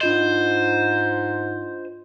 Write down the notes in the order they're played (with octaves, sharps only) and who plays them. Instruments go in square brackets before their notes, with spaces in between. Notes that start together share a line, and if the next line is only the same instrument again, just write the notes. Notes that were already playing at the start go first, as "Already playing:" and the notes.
[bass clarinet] G#2 [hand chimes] D4 F4 D#5 [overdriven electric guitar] C5